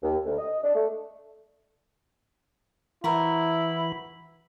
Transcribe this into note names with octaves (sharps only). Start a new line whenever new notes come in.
D#2
D2
D#5
D4
A3
E3 E4 F#4 A#4 C5 B5